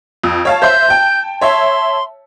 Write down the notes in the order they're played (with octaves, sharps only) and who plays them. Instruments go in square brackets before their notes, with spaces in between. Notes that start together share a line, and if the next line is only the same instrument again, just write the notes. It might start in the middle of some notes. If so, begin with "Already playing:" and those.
[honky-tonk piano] F2
C#5 F5 A5
[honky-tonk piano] C5 E5 C6 [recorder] G6
[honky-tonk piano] G5 A5
[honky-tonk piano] C#5 E5 A5 [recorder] C6